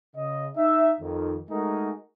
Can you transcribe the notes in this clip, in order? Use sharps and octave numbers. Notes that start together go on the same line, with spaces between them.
C#3 D#5
D#4 E5
F2 D#3
G#3 A3 D#4 F#4 G#4 A#4